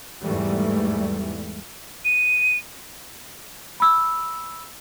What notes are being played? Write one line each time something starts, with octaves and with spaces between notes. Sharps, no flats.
E2 G#2 E3 G3 A3
D#7
B5 E6